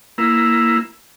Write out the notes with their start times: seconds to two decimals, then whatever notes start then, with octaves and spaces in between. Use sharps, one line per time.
0.18 A#3 E4